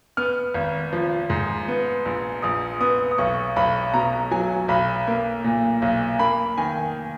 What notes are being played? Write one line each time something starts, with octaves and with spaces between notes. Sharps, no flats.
B3 F6
G#1
F3
G#2
B3
A#1
A#1 D#6
B3 D#6
D#6
B1 C#6
B1 B5
B2 A#5
F#3 G#5
B1 B5
A#3
A#2
B1
A#3 B5
D#3 G#5